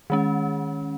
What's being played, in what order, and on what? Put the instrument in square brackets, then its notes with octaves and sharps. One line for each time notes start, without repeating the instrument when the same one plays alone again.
[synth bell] D#3 G#3 C#4